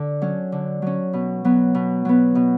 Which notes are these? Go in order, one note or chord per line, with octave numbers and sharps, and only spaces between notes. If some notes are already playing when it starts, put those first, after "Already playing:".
Already playing: D3
F#3 C#4
D3
F#3 C#4
B2
F#3 B3
B2
F#3 B3
B2